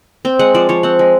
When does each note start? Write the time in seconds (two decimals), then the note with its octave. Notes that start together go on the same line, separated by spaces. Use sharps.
0.25 C4 G5
0.39 G#3 F#5
0.54 F3 D5
0.69 F3 C#5
0.83 C4 F#5
0.99 G#3